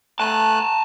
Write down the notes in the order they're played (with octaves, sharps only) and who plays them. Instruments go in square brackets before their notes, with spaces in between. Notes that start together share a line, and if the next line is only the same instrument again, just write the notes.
[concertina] A3 F#6 [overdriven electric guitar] G#5 A5